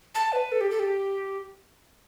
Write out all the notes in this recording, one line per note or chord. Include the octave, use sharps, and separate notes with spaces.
A5
B4
A4
G4
A4
G4